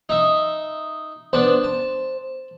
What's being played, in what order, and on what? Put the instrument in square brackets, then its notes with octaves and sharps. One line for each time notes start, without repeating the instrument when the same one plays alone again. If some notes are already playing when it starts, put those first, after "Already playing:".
[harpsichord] D#4 E5
[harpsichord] B3 D4 A5 [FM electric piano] C5
[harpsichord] A5